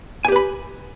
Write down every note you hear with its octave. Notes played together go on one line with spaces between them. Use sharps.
G4 B4 G#5 B5